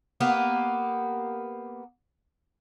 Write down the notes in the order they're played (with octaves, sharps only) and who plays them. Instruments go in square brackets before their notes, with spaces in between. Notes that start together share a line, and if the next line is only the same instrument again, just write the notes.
[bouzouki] A#3 B3 G4